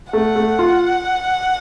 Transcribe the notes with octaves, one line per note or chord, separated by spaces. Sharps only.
A3 F#5
A3
F4